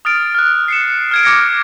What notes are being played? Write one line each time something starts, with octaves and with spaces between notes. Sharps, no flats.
D#6 F6 A6 D7
F6 F#6
C7 C#7 E7
F6 G#6 D7
D6 F6 G#6 A#6 C#7 D7